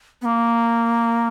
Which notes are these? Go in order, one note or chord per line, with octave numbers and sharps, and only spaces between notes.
B3
A#3